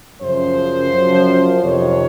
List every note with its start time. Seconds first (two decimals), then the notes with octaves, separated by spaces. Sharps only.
0.20 F#2 C#3 F3 C5
0.92 F#2 F3
1.63 F2 C3 D#3 C#5